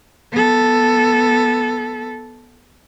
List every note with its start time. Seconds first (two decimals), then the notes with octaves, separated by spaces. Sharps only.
0.32 B3 A4